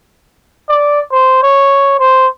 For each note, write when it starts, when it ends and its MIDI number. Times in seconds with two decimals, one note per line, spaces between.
0.69 1.00 74
1.11 1.38 72
1.43 1.97 73
1.99 2.27 72